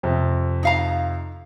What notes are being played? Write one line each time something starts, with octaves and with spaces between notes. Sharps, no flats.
F2 C3
D#4 F5 A#5